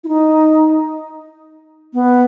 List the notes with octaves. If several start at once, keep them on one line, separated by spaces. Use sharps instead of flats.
E4
D#4
B3